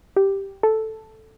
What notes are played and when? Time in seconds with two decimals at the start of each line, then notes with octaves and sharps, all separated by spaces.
0.16 G4
0.63 A4